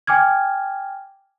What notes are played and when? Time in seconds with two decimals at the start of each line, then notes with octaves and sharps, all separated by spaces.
0.07 G5 G#5 D6 F6 G#6